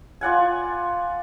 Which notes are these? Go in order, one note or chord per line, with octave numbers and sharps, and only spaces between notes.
F4 D5 F#5 G#5